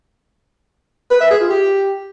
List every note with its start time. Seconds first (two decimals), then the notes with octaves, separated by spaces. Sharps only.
1.11 B4
1.20 E5
1.30 G#4
1.40 F4
1.50 G4